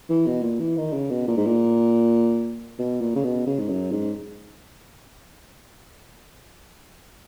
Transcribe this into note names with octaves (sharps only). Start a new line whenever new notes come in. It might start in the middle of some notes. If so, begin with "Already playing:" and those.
E3
B2
A#2
E3
D#3
C#3
B2
A#2
G#2
A#2
B2
A#2
C#3
B2
C#3
G#2
F#2
G#2